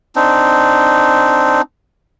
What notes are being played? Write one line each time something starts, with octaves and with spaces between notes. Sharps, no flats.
C4 D4 D#4